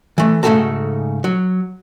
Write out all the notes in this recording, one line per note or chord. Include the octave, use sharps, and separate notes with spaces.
E3 A3
G#2 C#3 A3 F#4 A4 A#5
F#3